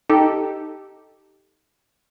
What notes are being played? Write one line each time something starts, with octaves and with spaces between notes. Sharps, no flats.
D#4 G4 A4